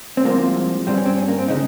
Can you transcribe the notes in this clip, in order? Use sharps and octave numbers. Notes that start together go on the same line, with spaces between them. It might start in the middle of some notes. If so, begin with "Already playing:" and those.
C4
C2 C3 F3 G#3 A#3
G2 G3 C4
C#4
C4
C#4
A#3
C4
C#3 G#3 D#4